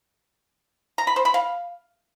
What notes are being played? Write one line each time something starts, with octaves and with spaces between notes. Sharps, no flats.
A#5
B5
C5
B5
F5